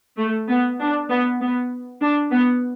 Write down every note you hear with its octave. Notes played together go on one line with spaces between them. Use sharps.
A3
B3
D4
B3
B3
D4
B3